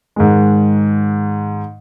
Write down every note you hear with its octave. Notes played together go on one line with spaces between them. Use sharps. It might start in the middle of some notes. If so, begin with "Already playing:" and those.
G#2 D#3 G#3